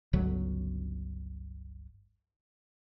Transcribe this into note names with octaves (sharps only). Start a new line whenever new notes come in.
G1 C#2 D3 F#3